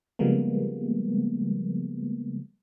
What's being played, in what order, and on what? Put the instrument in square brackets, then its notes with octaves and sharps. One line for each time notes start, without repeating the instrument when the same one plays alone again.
[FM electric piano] C#3 F3 G3 G#3 A#3 B3